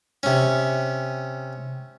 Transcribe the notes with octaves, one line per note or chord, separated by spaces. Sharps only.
C3 C#4